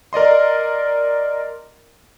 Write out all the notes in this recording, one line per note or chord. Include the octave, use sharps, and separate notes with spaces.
A#4 D5 D#5 C6